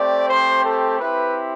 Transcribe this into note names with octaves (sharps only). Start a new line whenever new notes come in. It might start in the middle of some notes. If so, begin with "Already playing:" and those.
Already playing: A3 C4 G4 D5
C5
A4
C4 E4 G4 B4